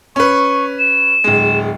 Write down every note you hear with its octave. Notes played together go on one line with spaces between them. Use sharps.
C#4 B4 C#6
E7
D1 G#3